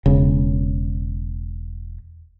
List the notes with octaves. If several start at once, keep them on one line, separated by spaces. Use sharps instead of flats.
E1 C#3